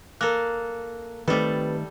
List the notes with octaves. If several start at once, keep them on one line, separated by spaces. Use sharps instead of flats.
A#3 A4 A#4 F#6
D#3 G3 A3 C4 G4 A4 B4